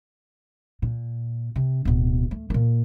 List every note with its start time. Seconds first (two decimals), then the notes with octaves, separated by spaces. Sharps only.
0.82 A#2
1.56 C3
1.85 D1 B2
2.31 A3
2.50 A#2 A#3